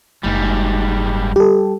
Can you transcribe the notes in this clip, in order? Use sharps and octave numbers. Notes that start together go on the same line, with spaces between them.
F#1 G#2 G3
G3 G4 A4